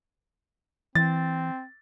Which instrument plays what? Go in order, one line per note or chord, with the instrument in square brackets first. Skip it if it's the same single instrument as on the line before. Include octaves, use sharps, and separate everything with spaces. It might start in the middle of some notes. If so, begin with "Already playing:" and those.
[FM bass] E3 [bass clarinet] C4 [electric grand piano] A6